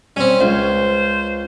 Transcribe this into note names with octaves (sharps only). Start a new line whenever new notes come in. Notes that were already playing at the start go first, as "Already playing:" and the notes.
G3 C4 C#4
C#2 C5